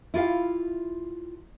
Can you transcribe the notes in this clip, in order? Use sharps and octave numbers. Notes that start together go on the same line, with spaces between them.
E4 F4 G4 F5